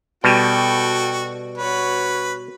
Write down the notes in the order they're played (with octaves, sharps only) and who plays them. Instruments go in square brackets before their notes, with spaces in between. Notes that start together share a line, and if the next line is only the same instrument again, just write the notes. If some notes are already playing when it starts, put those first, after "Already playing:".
[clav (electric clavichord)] B2 G3 [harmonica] F#4 [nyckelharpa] A4 G5
[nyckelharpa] F#4 C#5 [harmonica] B4